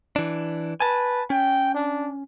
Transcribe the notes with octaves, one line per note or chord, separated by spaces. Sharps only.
E3 D4
B4 G#5 A5
C#4 G5
D4